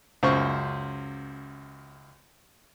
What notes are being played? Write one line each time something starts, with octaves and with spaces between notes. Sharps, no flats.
C#2 F#2 C5 C#6